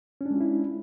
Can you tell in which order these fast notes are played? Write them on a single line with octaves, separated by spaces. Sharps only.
C#4 D4 G#3 F4 E4